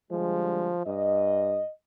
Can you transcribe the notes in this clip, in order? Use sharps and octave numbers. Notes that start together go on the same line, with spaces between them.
D3 F3 G3 G#3
G2 D#5